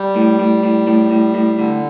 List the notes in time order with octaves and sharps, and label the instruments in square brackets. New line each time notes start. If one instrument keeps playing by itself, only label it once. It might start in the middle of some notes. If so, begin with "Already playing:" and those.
Already playing: [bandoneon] G3
[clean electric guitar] A2
A2
A2
A2
A2
A2
[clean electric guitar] A2 [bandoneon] D3